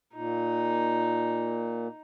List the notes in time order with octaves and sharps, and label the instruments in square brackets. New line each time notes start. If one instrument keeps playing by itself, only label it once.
[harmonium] A#2 [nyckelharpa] D#4